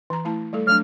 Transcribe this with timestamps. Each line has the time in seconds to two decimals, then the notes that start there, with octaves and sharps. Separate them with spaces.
0.10 E3 A#5
0.25 A3 E4 A5
0.53 G3 A3 A4
0.67 F#3 A3 D4 F6